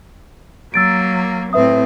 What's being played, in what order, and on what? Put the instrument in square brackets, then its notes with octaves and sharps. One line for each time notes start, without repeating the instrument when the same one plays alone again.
[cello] F#3 A#3 [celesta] E6 A6 D7
[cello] A2 C4 [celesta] B4 E5 D#6